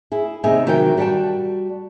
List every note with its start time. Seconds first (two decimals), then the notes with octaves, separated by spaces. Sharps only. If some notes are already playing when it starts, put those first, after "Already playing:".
0.12 E4 G#4
0.44 D#2 C3 D#4 G#4 E5 G#5
0.66 C3 D#3 E3 F#3 F#4 G5
0.97 G3 F#4 D5 G5 A5